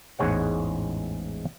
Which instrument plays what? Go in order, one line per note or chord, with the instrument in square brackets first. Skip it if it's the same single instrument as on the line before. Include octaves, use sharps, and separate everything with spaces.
[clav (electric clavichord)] A1 E2 G#2 G#3 C#5 F#5